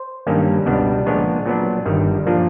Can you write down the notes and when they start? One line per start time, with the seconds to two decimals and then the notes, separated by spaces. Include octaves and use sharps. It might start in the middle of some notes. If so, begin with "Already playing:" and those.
Already playing: C5
0.27 G2 D#3 G3 A#3 C#4
0.66 C#2 B2 G3 B3 D4
1.06 A#2 F3 G#3 B3 D4 C#5
1.46 A#2 F#3 B3 D4
1.86 G1 G2 D#3 G3
2.26 A#2 F3 A#3 D4